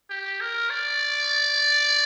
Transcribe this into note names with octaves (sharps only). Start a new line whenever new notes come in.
G4
A#4
D5